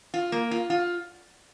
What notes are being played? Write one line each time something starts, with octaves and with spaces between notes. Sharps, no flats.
F4
A#3
F4
F4